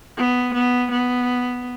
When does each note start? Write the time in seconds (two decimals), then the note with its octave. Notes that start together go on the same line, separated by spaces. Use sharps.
0.17 B3
0.54 B3
0.91 B3